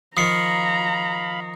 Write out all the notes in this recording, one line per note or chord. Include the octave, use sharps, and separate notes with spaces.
D#3 F3 F5 A#5 B5 D#6 C7 C#7